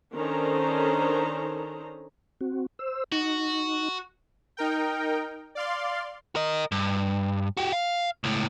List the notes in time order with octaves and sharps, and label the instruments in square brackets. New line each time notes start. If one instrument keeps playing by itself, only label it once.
[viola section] D#3 C#4 D4 A4 C5 A#5
[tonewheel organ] C4 F#4
C5 E6
[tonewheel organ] D#4 [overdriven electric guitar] F#4
[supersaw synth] D#4 A#4 G5
D5 F5 C6
[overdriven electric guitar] A#4 D#5
G2
F#4 G4
F5
C#2 A2